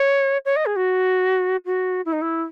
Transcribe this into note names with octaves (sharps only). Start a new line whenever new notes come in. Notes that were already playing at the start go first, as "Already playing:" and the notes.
Already playing: C#5
C#5
D#5
G#4
F#4
F#4
E4
D#4
E4